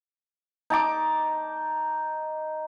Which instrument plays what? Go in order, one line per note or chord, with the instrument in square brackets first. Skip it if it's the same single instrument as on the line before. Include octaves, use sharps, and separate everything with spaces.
[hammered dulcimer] D#4 A5 D6